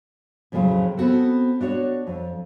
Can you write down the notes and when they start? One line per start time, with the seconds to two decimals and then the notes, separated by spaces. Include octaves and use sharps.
0.52 F2 A2 C#3 F#3 C#4 C5
0.97 B3 C4 F#4 A4
1.61 D4 F#4 C#5
2.07 F2